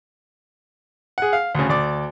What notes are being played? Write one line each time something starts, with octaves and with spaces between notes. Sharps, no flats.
G#4 F#5
F5
D2 C#3
D2 D5 D6